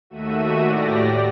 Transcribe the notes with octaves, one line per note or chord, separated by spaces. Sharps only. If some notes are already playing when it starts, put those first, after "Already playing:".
D#2 A3 F#4 E5 D#7
A2 G4 D5 A#6